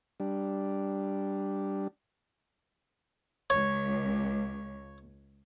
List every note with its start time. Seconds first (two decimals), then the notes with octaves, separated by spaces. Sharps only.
0.20 G3 D4
3.50 C#2 C#5